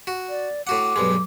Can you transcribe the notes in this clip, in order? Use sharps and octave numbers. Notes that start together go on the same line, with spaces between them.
F#4
D5
A2 F#4 F#5 D6
B1 G2 G#3